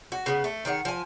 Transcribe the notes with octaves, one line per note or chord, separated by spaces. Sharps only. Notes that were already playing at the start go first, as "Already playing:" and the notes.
F#4
C#3 B3
A3
D#3 G#4 D5 F#5
F3 G#5